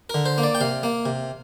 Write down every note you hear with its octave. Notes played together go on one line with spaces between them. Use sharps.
D3 A#4
C5
A#3
D5
G5
C3 F5
A#3
C3